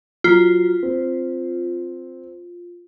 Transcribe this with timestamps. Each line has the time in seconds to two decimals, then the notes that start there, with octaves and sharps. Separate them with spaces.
0.24 F#3 F4 A#5
0.83 C4